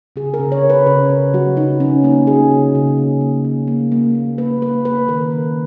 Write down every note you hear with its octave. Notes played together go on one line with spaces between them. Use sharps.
C#3 G#4
A#4
C#3
C#5
C#3
B4
C#3 A#4
C#3
F#3 F#4
C#3 D#4
C#3 C#4
A#3 D#4
A#3 G#4
C#3
C#3
A#3
A#3
A#3
A#3
A#3
A#3
A#3 B4
A#3 B4
A#3 B4
D#3 A#4
D#3